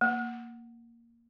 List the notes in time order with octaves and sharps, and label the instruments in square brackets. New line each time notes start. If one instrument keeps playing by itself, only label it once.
[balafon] A#3